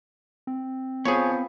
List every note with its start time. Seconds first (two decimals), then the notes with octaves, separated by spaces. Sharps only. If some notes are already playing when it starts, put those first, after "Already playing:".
0.47 C4
1.05 F3 B3 G#4 C#5